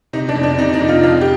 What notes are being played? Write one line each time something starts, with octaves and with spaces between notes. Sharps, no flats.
C3 D#4
D4
F2
D4
C3 D#4
D#4
F2
F4
F2 F4
G4